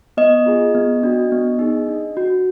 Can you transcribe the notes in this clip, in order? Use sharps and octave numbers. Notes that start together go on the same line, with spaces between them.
B3 D#5
F4 G#4
B3
D4 F#4
B3
D#4 G#4
D4
F#4